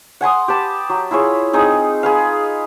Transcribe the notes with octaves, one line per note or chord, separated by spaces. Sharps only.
F#5 G#5 C6 D#6
G4 B4 A5
F#3
E4 F4 G#4 C#5
C4 D#4 G#4 D#5
G#4 B4 F5